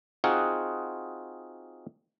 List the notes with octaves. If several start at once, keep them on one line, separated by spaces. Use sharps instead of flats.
C4 D#4 F4 F#4 G#4 F#5